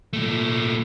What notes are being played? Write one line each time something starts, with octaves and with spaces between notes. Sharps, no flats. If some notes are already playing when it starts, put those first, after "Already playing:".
A#2 A3